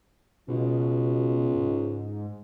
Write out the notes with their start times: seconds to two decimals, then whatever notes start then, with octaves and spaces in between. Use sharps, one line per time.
0.48 C#2 B2
1.55 G#2